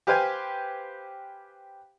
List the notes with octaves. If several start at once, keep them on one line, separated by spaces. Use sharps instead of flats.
G4 B4 C5 F5 G5 G#5